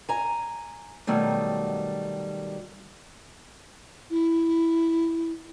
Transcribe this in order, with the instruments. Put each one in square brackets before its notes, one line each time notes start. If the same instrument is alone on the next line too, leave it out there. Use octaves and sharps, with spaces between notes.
[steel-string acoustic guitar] G#5 A#5
B2 D#3 F#3 G3 A3
[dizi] E4